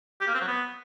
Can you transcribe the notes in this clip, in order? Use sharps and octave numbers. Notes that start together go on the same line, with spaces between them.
G4
A#3
C4
F#3
B3